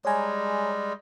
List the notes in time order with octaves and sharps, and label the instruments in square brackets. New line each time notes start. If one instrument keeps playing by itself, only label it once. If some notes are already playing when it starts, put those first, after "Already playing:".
[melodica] G3 G#3 [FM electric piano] C#5 G#5 A#5